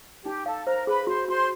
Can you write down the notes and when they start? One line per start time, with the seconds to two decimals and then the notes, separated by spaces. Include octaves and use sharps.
0.25 D#4 G4 G5
0.46 A4 F5 A5
0.66 A#4 C5 A#5
0.87 G#4 B4 B5
1.07 F#4 C5 C6
1.28 F#4 C5 C6